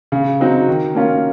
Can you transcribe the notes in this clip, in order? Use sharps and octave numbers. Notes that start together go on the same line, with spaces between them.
C#3
F#3 C4 D#4 F#4
D#3
A#3 C#4 F4